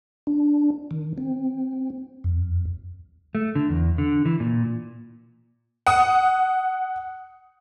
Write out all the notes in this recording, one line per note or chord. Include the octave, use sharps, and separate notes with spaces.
D4
D#3
C4
F2
A3
D3
E2
D3
E3
A#2
F#5 D#6